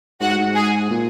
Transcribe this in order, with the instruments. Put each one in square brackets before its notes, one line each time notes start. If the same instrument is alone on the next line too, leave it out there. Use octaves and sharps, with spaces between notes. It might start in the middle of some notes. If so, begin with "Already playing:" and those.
[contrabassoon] G#2 [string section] F#4 F#5
[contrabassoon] G#2
[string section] G#4 G#5
[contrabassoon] A#2